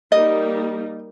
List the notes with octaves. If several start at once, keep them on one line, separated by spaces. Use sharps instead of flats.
G3 A#3 D#4 D#5